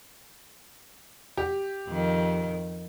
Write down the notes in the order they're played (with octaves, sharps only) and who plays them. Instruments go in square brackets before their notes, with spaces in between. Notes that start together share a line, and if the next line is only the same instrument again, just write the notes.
[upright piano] G4
[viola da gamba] F2 D#3